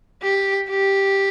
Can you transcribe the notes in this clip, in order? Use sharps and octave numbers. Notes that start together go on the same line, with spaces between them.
G4
G4